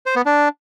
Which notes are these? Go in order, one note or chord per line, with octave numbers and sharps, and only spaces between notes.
C5
B3
D4